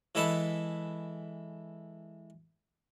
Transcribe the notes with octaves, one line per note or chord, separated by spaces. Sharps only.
E3 G#3 A4 B4 E5 A5